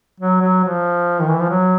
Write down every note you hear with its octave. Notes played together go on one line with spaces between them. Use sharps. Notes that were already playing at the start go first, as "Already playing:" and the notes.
F#3
F#3
F3
D#3
E3
F3
F#3